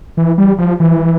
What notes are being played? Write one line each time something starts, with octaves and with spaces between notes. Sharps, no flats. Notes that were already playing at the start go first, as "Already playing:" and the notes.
E3
G3
F3
E3